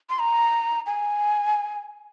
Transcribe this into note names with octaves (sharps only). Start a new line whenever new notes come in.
C6
A#5
G#5